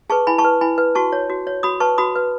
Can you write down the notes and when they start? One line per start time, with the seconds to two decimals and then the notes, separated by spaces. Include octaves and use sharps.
0.10 G#4 B4 A5 C#6
0.27 E4 G#5 B5
0.38 A5 C#6
0.44 B4
0.61 E4 G#5 B5
0.78 B4
0.95 F#4 A5 C#6
1.12 C#5
1.30 F#4
1.47 C#5
1.63 F#4 B5 D#6
1.80 B4 A5 C#6
1.98 F#4 B5 D#6
2.16 B4